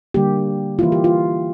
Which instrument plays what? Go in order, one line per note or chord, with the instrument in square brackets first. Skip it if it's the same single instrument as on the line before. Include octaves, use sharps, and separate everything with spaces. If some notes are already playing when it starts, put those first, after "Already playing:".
[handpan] D3 G3 A#3 G4
E3 A#3 E4 F4
G4
F4